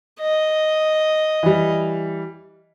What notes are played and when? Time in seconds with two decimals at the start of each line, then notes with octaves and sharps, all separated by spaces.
0.20 D#5
1.43 E3 G3